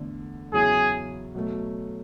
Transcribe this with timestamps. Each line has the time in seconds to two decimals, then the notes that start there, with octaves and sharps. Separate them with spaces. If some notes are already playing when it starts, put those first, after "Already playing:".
Already playing: E2 D3 A3
0.51 E2 C#3 F#3 C#4 E4 G#4
1.35 B2 F#3 A3